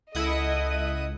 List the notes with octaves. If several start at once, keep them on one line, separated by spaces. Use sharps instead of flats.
C#2 E4 A4 D#5 F#5 D#6